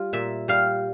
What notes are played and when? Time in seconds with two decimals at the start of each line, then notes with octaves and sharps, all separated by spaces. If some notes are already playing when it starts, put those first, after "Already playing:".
Already playing: G3 F4
0.13 A#2 E5
0.48 G3 F5